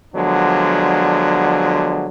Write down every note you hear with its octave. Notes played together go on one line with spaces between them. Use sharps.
D3 F3 F#3 G#3 B3 D4